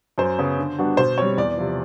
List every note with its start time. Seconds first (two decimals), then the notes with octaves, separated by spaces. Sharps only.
0.18 F#2 C5
0.39 C#3 F#3 B3
0.58 D3
0.79 G3 B3 D4 F#4
0.97 B2 C5
1.18 G3 C4 C#5
1.37 E2 D5
1.57 C3 F3